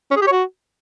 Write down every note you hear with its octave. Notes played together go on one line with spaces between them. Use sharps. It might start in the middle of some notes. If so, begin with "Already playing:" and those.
C#4
G#4
G4
C#5
F#4